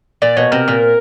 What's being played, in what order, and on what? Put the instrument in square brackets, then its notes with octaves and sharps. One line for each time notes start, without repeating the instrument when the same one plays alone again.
[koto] A#2 [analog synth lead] D5
[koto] B2 [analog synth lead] C#5
[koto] C3 [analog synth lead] A#4
[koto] A#2